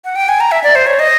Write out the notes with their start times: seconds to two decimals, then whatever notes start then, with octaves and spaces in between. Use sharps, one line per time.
0.05 F#5
0.16 G5
0.29 G#5
0.40 A#5
0.51 E5
0.64 D5
0.75 C5
0.87 C#5
0.99 D#5